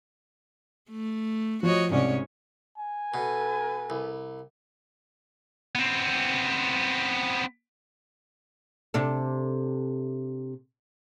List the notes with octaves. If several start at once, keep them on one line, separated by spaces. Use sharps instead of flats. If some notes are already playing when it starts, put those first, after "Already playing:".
A3
F3 F#4 C#5 D#5
C2 G#2 C#4 C#5 D5
G#5
B2 A4 B4
C2
B3 C4
C3 D4 A4